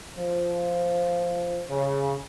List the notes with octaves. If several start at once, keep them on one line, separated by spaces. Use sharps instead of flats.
F3
C#3